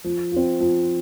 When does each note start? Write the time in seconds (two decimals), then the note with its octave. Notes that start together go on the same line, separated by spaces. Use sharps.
0.04 F3
0.32 C4 F4
0.60 F3